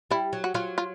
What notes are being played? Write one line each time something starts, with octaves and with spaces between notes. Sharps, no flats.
G3 E4
F#3
F#4
F#3 F4
F4